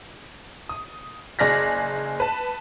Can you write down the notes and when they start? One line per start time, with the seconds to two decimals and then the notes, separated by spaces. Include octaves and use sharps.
0.69 D#6
1.39 F#1 G#4 D5 F6 A#6 B6
2.20 B4 A5